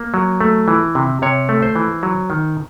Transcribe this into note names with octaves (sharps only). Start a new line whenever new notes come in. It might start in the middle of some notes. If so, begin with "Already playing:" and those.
Already playing: A#3
F#3
A3
E3
C3
C3 C#5
A3
C5
E3
F#3
D#3